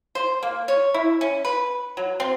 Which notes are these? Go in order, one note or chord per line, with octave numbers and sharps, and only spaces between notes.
C5
A#3
C#5
E4
C#4
B4
F#3
C4